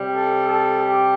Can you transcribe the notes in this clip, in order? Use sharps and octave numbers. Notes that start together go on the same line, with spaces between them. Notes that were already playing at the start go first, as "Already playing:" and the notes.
Already playing: C3 G3
A4
A4
G4